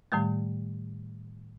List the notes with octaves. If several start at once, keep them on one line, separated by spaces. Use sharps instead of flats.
A2 D#3 G3 A3